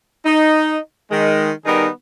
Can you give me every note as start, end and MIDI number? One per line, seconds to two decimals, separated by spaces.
0.25 0.77 63
1.11 1.50 51
1.11 1.50 56
1.65 1.87 51
1.65 1.87 55
1.65 1.87 59
1.65 1.87 63
1.65 1.87 68
1.65 1.87 70